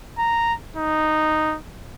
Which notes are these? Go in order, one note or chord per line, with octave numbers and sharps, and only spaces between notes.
A#5
D#4